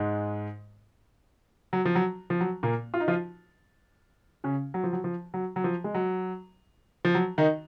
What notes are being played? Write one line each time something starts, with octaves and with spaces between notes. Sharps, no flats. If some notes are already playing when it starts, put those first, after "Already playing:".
Already playing: G#2 G#3
F#3
F3
F#3
F3
F#3
A#2 A#3
F4
D#4
F3 F4
C#3 C#4
F#3
F3
F#3
F3
F#3
F#3
F3
G#3
F#3
F3
F#3
D#3 D#4